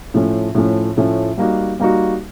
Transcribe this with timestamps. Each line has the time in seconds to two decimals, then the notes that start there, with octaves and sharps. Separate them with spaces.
0.14 A2 F3 A3 C#4
0.55 A2 F3 A3 C#4
0.97 A2 F3 A3 C#4
1.38 G3 A#3 D#4 F#4
1.80 G3 A#3 D#4 F#4